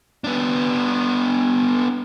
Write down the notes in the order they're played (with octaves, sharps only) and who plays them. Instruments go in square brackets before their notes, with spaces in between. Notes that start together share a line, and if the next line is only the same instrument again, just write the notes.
[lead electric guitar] B3 D4